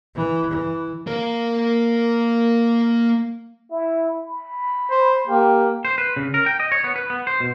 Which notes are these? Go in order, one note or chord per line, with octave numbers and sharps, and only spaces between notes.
E3
E3
A#3 A#4
E4
B5
C5
A#3 G4
C5
B4
C#3
A#4
G5
D#5
C#5
B3
B4
B3
C5
B2